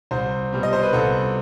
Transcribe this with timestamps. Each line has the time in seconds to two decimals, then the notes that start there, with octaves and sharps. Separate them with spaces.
0.11 C2 C5
0.53 B2 G3
0.63 D#5
0.73 C5
0.83 B4
0.93 C2 A4